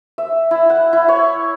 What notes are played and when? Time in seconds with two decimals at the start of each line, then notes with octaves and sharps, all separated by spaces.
0.18 E5
0.51 E4
0.70 F#5
0.93 E4
1.08 C#5